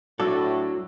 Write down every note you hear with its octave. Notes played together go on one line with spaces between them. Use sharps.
A2 F#3 D4 F#4 A4 D6 E6